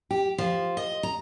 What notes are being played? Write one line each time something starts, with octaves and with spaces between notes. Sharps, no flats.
G4
F3
D#5
A#5